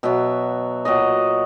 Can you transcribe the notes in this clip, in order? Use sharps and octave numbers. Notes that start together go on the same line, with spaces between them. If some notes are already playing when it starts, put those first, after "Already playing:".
B2 F#3 E5
A#2 F#3 D#5